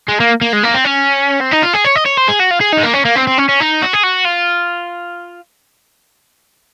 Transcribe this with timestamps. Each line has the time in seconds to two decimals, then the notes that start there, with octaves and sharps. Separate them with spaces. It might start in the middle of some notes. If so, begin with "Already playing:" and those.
0.09 G#3
0.20 A#3
0.41 A#3
0.53 G#3
0.64 A#3
0.75 C4
0.85 C#4
1.41 C4
1.51 D#4
1.63 F4
1.73 G#4
1.85 C#5
1.95 D#5
2.06 C#5
2.17 C5
2.28 G#4
2.39 F#4
2.51 F4
2.61 G#4
2.73 D#4
2.78 G#3
2.83 A#3
2.94 C#4
3.05 A#3
3.16 C4
3.27 C4
3.38 C#4
3.49 C#4
3.60 D#4
3.82 F#4
3.93 G#4
4.03 F#4
4.25 F4